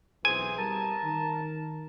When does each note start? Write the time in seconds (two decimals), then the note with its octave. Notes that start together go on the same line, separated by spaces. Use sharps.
0.25 B1 E3 C4 G#4 G#5
0.58 G3 A#4 A5
1.03 D#3